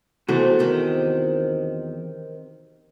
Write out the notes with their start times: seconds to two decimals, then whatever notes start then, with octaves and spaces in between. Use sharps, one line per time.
0.28 E2 C3 E3 G#3 A3 F#4
0.59 C3 D#3